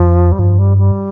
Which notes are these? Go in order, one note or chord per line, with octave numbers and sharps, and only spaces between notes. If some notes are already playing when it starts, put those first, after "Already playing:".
Already playing: F2 F3
G3
G2 F3
G3
G3